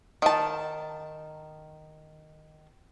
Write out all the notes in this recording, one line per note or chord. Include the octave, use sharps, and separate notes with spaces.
D#3 A5